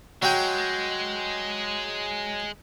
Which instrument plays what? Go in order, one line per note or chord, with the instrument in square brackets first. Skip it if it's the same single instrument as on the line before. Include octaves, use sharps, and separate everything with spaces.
[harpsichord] F#3 G5 [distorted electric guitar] G#3